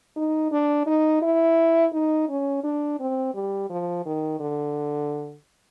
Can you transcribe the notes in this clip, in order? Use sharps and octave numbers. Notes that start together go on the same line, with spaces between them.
D#4
D4
D#4
E4
D#4
C#4
D4
C4
G3
F3
D#3
D3